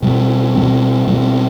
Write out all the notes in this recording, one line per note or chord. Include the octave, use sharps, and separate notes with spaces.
B2 G3 C4
B2 G3 C4
B2 G3 C4